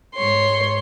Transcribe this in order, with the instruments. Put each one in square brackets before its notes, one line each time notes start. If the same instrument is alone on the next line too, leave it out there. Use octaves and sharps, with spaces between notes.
[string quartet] G#2 C#5 C6